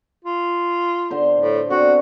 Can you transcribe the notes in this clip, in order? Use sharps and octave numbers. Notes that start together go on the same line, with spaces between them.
F4
D3 C5 C6
A2
D3 C4 F#4